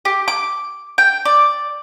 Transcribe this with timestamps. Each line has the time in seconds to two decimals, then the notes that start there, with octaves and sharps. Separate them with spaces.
0.05 G4
0.28 D6
0.98 G5
1.25 D5